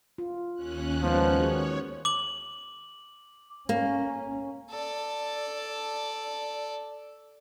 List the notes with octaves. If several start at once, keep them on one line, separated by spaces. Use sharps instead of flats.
F4
D#2 C#4 F#6
F3 G#3 B3 D#4
D#3 F#4 G#4 C#5
D6 F#7
A#3 C#4
A4 D5